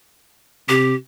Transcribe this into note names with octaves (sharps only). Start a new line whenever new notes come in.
C3 G4